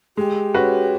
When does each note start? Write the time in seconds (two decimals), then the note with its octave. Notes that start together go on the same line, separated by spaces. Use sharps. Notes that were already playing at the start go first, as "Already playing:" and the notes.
0.17 G#3 G4
0.54 C#4 F#4 B4